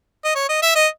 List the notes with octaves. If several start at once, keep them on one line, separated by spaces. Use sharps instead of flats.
D#5
C#5
D#5
E5
D#5